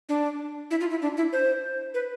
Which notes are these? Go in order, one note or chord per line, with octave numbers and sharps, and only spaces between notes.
D4
E4
F4
E4
D4
E4
C5
B4